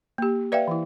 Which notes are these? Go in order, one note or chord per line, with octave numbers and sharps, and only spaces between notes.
A#3 G4
B4 D5 E5 F5 G5
E3 E4